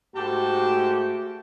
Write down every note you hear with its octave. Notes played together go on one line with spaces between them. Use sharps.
G#2 A3 F#4 G4 A5